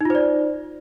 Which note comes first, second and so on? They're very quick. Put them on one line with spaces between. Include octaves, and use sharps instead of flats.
D#4 F4 C5 D5